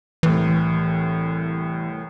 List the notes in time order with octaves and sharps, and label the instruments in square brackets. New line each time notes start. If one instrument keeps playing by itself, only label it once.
[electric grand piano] C2 A2 [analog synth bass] E3